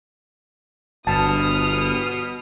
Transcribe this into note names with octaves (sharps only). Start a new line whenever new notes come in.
G1 B2 A5 D#6 F6